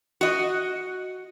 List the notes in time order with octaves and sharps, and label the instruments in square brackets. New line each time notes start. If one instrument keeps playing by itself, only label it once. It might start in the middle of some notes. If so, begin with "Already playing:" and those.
[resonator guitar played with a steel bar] F#4 D#5